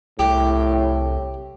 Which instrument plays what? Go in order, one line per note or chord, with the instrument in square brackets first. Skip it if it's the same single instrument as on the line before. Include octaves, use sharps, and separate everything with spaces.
[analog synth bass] C2 [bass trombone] A2 [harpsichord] G4